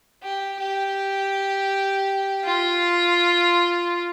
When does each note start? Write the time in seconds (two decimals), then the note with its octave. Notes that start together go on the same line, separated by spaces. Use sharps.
0.22 G4
0.59 G4
2.44 F4